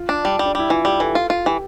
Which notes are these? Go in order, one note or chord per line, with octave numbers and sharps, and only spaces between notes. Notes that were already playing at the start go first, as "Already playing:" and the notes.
Already playing: F4
D4
G3
G3
D4
G3 E4
E3 F4
G3 G4
E3 A4
F4
F4
E3 G4